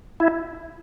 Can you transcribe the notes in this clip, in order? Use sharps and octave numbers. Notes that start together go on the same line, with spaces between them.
E4